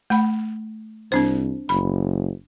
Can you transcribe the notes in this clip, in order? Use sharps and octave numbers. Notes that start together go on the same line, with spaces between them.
A3 F#5 B5
C2 C4 D4 C5
F#1 B5